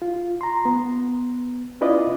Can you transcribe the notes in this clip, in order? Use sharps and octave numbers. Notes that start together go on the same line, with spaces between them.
F4
A#5 C6
B3
C#4 E4 F4 B4 D5 D#5